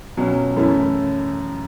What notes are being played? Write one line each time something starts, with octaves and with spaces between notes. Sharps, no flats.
C#2 B2 F#3 C#4
F#2 E3 A3 C#4 E4